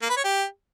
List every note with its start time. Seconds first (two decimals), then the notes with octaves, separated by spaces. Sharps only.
0.02 A#3
0.10 B4
0.17 C#5
0.24 G4